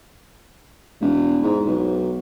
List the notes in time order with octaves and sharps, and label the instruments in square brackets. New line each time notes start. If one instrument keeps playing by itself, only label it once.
[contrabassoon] E1
G#2
B1